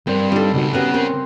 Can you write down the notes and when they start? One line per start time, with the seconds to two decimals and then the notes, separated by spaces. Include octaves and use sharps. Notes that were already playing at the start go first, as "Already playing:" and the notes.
0.07 G2 C4 A#4 D5
0.32 G3 D4 D#4 A4
0.54 C#2 B2 D#4 F#4
0.73 C#3 B3 F#4 G4 A#4 B4
0.94 C4 A#4